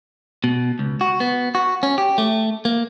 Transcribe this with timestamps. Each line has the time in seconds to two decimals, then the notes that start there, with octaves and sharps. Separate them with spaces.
0.44 B2
0.79 C#2
1.01 F#4
1.20 B3
1.55 F#4
1.83 C#4
1.98 G4
2.18 A3
2.65 A#3